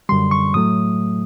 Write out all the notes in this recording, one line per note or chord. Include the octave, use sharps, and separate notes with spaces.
F#2 D3 G3 C6
C#6
A2 F#3 A3 D#6